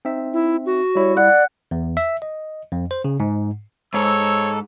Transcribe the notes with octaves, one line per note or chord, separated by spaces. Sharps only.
C4 D#4 E5
E4
F#4
G3 E4 C#5
D5 F#5
E2
E5
D#5
F2
C5
C#3
G#2
G#2 A4 C#5 E6